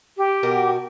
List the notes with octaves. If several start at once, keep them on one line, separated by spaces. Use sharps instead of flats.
G4
B2 F#4 A#4